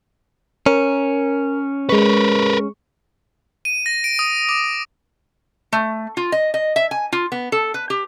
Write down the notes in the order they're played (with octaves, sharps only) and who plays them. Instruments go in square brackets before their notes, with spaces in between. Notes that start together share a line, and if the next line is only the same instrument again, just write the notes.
[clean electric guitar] C#4 [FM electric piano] A#4
[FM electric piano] G#3 C#6 [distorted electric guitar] A#4 B4
[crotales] D#7
A#6
D7
D#6
D6
[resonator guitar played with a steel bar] A3
F4
D#5
D#5
E5
G#5
F4
B3
A4
B4
G4